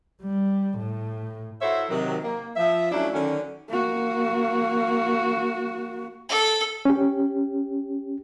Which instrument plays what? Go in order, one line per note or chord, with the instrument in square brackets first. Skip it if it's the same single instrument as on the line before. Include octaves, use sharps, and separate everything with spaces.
[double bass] G3
A2
[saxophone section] E4 F#4 A4 C5 C#5 E5
C3 D#3 F#3
A#3
F3 E5
F#3 A3 C#4 D4 E4
D3 D#3 F#3 C#4
[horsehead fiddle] A#3 F#4
[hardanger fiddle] A4
[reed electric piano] C#4 G4